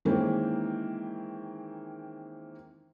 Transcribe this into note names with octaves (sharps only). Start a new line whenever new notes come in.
D#3 E3 G#3 A#3 C4 C#4